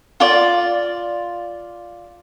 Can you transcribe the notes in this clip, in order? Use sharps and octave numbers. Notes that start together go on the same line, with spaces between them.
F4 D5